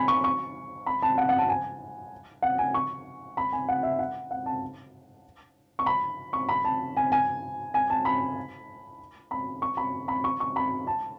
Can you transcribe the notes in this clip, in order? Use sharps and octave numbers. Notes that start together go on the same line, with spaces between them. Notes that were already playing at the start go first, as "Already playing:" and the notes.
Already playing: G#5 B5
C#6
C#6
B5
A5
F#5
F#5
A5
G#5
F#5
G#5
C#6
B5
G#5
F#5
E5
F#5
F#5
A5
C#6
B5
C#6
B5
A5
G#5
G#5
G#5
A5
B5
B5
C#6
B5
B5
C#6
C#6
B5
A5